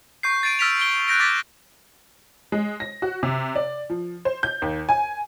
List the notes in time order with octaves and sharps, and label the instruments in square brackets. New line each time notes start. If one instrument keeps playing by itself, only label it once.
[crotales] C#6 G6 C7
A6 C7 D7 D#7
E6 F6 A6 B6 D7 F7
D7 G7
F#6 G6 A#6 D7
D6 A6 B6
[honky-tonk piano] G#3
A#6
F#4
C3
D5
F3
C5
G6
D#2
G#5